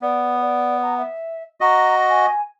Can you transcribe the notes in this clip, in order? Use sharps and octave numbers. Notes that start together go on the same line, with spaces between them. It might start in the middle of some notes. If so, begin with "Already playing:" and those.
B3 D5
D5
A#5
E5
F#4 D#5 A#5
G#5